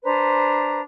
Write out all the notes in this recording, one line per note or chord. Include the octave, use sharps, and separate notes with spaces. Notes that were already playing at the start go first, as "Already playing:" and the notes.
D4 B4 C5 A#5